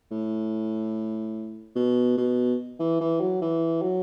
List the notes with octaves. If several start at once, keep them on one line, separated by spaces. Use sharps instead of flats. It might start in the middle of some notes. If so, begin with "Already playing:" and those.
A2
B2
B2
E3
E3
F#3
E3
F#3